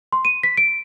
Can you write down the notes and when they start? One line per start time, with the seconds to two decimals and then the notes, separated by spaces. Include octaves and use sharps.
0.12 C6
0.25 D#7
0.43 B6
0.57 D7